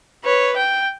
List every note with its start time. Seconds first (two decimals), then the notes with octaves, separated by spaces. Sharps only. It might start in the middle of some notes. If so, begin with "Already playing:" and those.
0.25 B4 C#5
0.56 G5